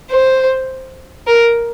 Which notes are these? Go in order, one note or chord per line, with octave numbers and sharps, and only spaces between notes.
C5
A#4